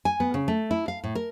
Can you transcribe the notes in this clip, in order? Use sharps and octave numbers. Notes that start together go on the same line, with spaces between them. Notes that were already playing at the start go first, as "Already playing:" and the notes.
G#5
B3
C#3
A3
E4
F5
A2
A#4